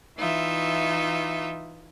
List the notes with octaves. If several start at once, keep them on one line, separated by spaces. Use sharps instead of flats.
E3 D#4 F4 E5